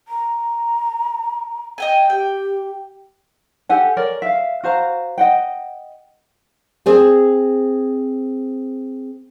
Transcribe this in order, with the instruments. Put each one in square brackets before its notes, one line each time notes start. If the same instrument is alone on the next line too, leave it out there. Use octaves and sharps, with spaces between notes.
[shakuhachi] A#5
[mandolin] D#5 G5 G#5
[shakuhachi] G4 [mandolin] G5
[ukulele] G4 A4 F#5 G#5
A#4 C#5 D5
E5 F5
F#4 C5 F5 A#5
D#5 F#5 G5
[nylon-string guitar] C4 G#4 C5 D5 G#5